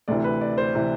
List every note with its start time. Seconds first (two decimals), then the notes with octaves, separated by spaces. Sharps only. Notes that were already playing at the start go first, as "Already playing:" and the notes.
0.08 D2 C3 E3 D5
0.24 B4
0.41 D5
0.58 C5
0.75 C3 E3